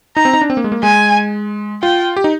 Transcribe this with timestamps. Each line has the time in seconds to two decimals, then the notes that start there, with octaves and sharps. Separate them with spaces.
0.16 D#4 A#5
0.25 C4
0.33 D#4
0.42 D4
0.50 C4
0.57 A#3
0.64 G#3
0.72 A#3
0.83 G#3 G#5
1.82 F4 G5
2.16 G4
2.24 D#4